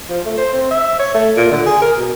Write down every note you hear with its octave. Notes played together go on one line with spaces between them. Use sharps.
F3
A3
C5
C4
E5
C#5
A3
A#2
D3
G#4
A#4
B2